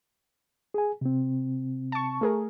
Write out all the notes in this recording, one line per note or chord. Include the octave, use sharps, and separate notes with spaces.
G#4 G#5
C3 C4
A5 C#6
A3 G#4 A#4